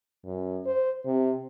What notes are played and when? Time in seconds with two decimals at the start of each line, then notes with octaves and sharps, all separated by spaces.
0.25 F#2
0.66 C5
1.06 C3